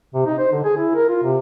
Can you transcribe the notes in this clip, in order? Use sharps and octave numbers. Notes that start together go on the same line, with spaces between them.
C3
D#4
C5
D3
G#4
E4
A#4
F4
C3